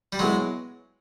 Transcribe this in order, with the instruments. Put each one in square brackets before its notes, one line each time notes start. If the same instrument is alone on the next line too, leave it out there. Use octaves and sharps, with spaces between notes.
[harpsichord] G3
[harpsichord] F#3 G#3 [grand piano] B3 E4 G#4 C#5